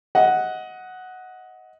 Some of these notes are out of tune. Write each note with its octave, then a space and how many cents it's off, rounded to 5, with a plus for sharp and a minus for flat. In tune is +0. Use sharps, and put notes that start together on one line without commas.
D#5 +20 F#5 +0